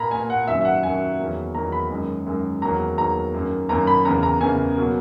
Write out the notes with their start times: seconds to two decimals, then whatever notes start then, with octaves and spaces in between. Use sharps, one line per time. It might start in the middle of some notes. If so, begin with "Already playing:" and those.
Already playing: A#2 A#3 A#5 B5
0.11 A#2 A#3 G#5
0.30 F#5
0.47 F#2 D#3 F#3 E5
0.61 E5
0.65 F#5
0.83 F#2 D#3 F#3 G#5
1.19 E2 D#3 F#3 A#3
1.54 E2 D#3 F#3 A#3 A#5
1.72 B5
1.90 F#2 D#3 G#3
2.26 F#2 D#3 G#3
2.62 E2 D#3 F#3 A#3 A#5
2.97 E2 D#3 F#3 A#3 A#5
3.34 F#2 D#3 A#3
3.69 F#2 D#3 A#3 A#5
3.87 B5
4.05 E2 C#3 E3 A#3 A#5
4.23 A#5
4.41 E2 C#3 E3 A#3 G#5
4.76 B2 F#3 A#3